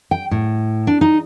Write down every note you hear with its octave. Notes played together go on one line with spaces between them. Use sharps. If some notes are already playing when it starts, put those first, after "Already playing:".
G5
A2
D4
D#4